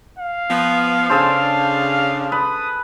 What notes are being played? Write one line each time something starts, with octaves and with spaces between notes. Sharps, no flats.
F5
F3 B3
C#3 D4 G#4 A4 C5
B4 D#6